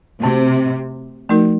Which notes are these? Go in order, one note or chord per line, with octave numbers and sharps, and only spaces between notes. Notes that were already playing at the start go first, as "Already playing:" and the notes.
C3 A3 C4 F#4
F3 A3 D#4 F#4 A#4